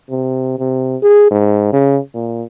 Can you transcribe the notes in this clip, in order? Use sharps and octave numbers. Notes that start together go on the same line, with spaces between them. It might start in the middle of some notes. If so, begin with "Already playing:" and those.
C3
C3
G#4
G#2
C#3
A#2